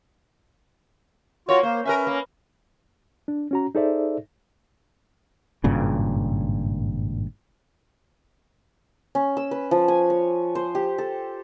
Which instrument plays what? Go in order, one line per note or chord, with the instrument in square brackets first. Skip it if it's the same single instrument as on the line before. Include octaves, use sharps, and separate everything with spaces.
[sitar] A#3 C#5 [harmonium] F4 F#4
[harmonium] A#3 [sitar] C5
[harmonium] C#4 [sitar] A#4 B4 E5
[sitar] A#3
[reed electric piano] D4
C#4 F#4 A#5
D#4 G#4 A4 C5 D5 E5
[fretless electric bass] G#1 G2 A#2 C#3
[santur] C#4
E6
B4
F3
G#5
C#5
C5
G4
A4